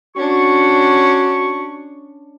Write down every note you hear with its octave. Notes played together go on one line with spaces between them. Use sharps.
C#4 D4 F#4 C#6